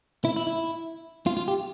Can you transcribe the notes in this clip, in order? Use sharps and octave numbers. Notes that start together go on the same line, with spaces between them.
E4
E4
E4
F4
F4
G4